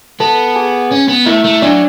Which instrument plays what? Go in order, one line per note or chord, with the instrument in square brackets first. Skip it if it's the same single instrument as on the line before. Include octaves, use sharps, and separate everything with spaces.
[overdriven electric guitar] B3 [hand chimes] A4 A5
[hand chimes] G#4 G#5
[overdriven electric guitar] C#4
B3
[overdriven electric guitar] A3 [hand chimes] E4 E5
[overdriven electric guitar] A3
[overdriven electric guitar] F#3 [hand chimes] D4 D5